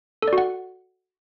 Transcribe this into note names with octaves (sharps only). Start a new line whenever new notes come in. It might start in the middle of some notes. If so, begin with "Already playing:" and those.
A4
D5
F#4
F#5